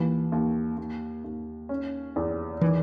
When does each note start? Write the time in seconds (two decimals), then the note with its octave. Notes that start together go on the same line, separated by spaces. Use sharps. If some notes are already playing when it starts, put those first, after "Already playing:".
Already playing: D#2 E3
0.32 D#2
0.77 D#2
1.24 D#2
1.69 C#4
2.16 E2
2.61 D#3 E3